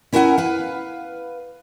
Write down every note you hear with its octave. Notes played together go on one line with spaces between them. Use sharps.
C#4 E4 A#4 B4 F#5 G#5
B4 F5